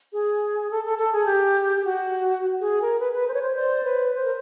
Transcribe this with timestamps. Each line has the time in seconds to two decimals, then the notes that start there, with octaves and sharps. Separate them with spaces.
0.14 G#4
0.71 A4
0.85 A4
0.99 A4
1.14 G#4
1.27 G4
1.76 G4
1.84 F#4
2.60 G#4
2.80 A#4
2.99 B4
3.13 B4
3.27 C5
3.34 C#5
3.42 C5
3.56 C5 D5
3.83 B4 C#5
4.13 C5
4.23 A#4